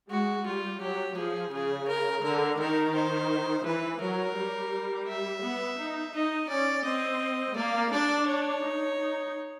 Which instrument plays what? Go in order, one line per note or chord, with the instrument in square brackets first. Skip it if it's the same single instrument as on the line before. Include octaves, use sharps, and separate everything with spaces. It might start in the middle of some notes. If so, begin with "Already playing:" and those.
[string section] G#3 [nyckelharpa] F#4
[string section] G3 [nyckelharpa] F4
[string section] F#3 [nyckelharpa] G4
[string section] F3 [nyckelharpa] G#4
[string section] C#3 [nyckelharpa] G#4
[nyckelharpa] A#4
[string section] D3 [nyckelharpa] A#4
[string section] D#3 [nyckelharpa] A#4
[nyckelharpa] C5
[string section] E3 [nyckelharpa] B4
[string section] F#3 [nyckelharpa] A#4
[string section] G3
[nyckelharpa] E5
[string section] B3
D#4
[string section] D#4 [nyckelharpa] D#5
[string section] C#4 [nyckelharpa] D5
[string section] C4 [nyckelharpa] D#5
[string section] A#3 [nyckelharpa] D5
[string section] D4 [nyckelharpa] D5
[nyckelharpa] C#5
[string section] D#4
D#4